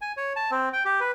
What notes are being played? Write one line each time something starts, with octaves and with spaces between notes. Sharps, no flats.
G#5
C#5
A5
C4
G5
G4
B4